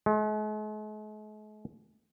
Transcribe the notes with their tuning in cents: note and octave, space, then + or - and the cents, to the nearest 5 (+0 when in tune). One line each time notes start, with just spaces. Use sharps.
G#3 +45